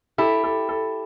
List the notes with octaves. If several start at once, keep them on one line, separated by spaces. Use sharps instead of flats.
E4 G4 A4
A4
A4